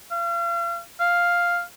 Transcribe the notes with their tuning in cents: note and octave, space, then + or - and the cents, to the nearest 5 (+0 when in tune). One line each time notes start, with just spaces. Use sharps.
F5 -40
F5 +0